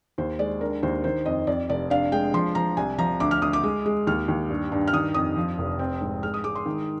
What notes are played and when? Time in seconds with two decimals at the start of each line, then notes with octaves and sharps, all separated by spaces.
0.18 D#2 C5
0.39 G#3 D5
0.61 D4 A#4
0.83 D#2 C5
1.04 D#3 C5
1.26 F2 D#5
1.47 F2 D5
1.69 F1 D5
1.90 D4 F5
2.12 G#3 G5
2.34 F3 C6
2.55 F3 A#5
2.77 C2 G#5
2.98 F3 A#5
3.20 D2 D6
3.31 F6
3.42 D2 D#6
3.53 D6
3.63 G#3
3.86 G#3
4.07 D#2 F6
4.28 D#2
4.50 G2
4.72 G2
4.88 F6
4.93 D#3 D#6
5.14 F2 D#6
5.36 F3
5.58 F1
5.79 C4
6.01 G#2
6.23 G#3 F6
6.34 D#6
6.44 G#3 D6
6.55 C6
6.66 D#3